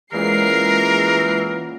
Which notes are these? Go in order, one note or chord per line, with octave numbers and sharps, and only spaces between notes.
A#2 C#3 E3 F#3 G#3 A#4 C7